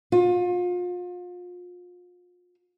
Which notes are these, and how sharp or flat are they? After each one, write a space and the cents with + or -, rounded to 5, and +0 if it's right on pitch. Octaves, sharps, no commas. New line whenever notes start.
F4 +35